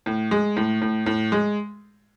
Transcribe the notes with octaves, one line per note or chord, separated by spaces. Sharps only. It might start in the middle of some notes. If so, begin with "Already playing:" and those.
A2
G#3
A2
A2
A2
G#3